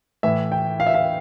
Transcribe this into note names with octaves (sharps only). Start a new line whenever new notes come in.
A2 E3 E5
G5
F5
E5
F5